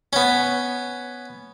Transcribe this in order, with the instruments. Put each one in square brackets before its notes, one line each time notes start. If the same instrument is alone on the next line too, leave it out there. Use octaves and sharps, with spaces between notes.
[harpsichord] B3 C#4